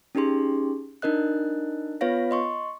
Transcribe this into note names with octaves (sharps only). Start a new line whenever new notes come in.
C#4 D#4 G4 G#4 C6
D4 D#4 A#4 D#5 F#6
B3 F4 B4 C#5 F5 A#6
D#5 C6 C#6